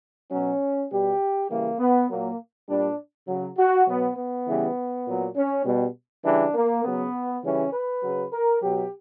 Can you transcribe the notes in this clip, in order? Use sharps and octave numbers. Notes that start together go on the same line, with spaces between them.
B2 F#3 C#4
B2 G3 G4
C#3 E3 G3 A#3
B3
A#2 F#3 A#3
A#2 G3 D4
C#3 F#3
F#4
B2 F#3 B3
B3
C#3 E3 G3
A#2 F#3
C#4
B2 G3
C#3 E3 G3 D4
A#3
C#3 F#3 B3
C#3 E3 G3 C#4
B4
C#3 F#3
A#4
B2 F#3 G4